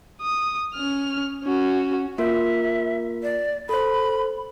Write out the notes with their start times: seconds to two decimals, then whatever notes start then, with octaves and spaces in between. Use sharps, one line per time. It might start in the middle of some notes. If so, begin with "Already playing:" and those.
0.21 D#6
0.75 C#4 F6
1.44 C#4 F#4
2.18 A#3 F4 A#4 E5
3.23 D5
3.69 A4 C5 B5